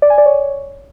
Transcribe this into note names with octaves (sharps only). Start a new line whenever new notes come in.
D5
G#5
D5
C#5